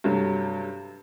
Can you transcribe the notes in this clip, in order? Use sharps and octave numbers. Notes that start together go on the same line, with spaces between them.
G2 C3 F#3 A3